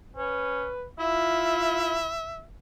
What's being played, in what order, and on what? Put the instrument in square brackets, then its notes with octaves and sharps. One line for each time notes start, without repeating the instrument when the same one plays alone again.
[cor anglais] C#4 [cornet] B4
[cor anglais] E4 [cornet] F4 [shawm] E5